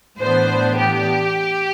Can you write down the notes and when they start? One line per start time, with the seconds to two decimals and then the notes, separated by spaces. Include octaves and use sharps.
0.19 A2 E3 B3 D4 C5
0.77 G4